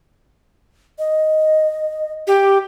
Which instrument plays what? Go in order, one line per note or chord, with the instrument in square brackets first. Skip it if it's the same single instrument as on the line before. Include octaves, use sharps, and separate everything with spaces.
[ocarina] D#5
[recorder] G4